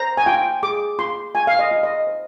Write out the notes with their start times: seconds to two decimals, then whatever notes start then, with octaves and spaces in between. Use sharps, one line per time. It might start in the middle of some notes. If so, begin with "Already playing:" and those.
Already playing: C5 A#5
0.17 G#5
0.26 F4 G5
0.63 G#4 D6
0.99 F4 C6
1.35 F4 G#5
1.47 F5
1.59 D#5
1.71 F4
1.83 D#5
2.07 C5